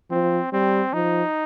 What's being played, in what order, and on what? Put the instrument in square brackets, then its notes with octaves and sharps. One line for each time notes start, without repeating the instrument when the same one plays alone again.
[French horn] F3 [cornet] C4
[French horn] G3 [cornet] C4
[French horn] F3 [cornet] D#4